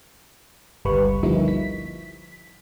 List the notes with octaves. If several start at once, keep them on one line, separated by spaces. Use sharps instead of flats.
G1 C#2 G3 B4 B5 C#6
D3 F3 G3 A#3 D#4 E4
B6